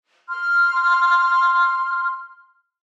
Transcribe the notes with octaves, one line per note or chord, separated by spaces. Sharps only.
C6 F6